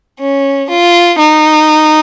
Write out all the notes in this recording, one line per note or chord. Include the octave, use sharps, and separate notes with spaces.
C#4
F4
D#4